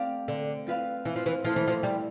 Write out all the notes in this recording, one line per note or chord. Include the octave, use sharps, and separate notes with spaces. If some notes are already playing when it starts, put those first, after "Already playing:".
Already playing: A3 C4 G4 D5 F5
D3
C4 F4 B4 F5
E3
F3
E3
F3 A3 E4 A4
E3
F3
G3